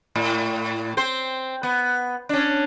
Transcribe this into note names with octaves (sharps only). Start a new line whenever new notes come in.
A2
C4 C5
B3
C#4 D4